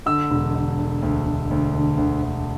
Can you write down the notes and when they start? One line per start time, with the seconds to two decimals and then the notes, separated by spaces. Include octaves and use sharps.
0.06 D3 E6
0.31 E1
0.55 D3
0.78 D3
1.02 D2
1.26 D2
1.51 D2
1.74 D3
1.97 D2
2.22 D2